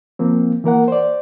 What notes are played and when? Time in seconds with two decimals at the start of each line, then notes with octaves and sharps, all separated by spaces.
0.19 F3 A#3 C4
0.64 E3 A#3 A#4 F#5
0.88 C5 D5